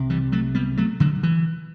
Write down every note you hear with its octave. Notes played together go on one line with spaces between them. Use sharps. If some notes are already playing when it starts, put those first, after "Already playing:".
Already playing: C2 C3
E3 G3
F#3 A3
G3 B3
F#3 A3
D3 F#3
E3